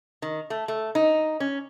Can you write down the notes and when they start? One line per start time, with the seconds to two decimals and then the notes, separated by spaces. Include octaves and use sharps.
0.22 D#3
0.50 A3
0.68 A3
0.95 D#4
1.40 C#4